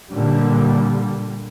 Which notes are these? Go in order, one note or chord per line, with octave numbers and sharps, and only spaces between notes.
A#2 D3 G3